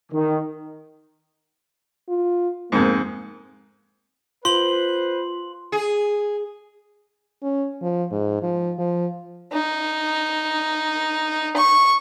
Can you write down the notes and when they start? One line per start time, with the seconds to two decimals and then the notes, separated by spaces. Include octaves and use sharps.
0.12 D#3
2.09 F4
2.72 F2 G#2 A#3
4.45 F4 B4 C5 C6 F#7
5.72 G#4
7.43 C#4
7.82 F3
8.12 G#2
8.43 F3
8.79 F3
9.53 D#4
11.56 C#6